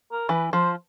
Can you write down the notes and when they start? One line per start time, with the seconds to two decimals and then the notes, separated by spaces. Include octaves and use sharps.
0.12 A#4
0.29 E3 B4
0.53 F3 C5